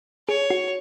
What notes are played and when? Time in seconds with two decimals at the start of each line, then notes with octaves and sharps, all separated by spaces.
0.28 G#4 C#5
0.50 F#4